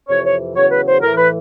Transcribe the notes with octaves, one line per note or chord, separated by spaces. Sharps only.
F2 C3 E3 C#5
C#5
E2 C#3 F#3 C#5
B4
C5
A2 E3 A#4
B4